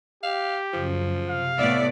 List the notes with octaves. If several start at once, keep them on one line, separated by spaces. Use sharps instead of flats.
G4 F5
F#2 C#3 F3
C3 F5
A2 B3 D5 E5